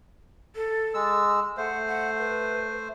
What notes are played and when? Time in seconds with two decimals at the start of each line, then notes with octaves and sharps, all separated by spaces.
0.56 A4
0.94 G#3 E6
1.57 A3 C5 F#5
1.87 F#5
2.19 B4